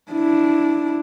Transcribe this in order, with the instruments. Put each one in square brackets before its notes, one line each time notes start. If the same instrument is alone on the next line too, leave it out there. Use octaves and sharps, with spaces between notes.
[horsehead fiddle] D4 E4